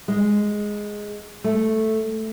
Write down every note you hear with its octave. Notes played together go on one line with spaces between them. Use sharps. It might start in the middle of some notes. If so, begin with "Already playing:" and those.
G#3
A3